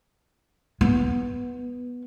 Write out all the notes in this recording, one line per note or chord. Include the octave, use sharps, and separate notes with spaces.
B3